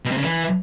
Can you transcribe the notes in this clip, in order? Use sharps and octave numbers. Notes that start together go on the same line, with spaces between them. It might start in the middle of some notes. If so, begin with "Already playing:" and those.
B2
C3
C#3
E3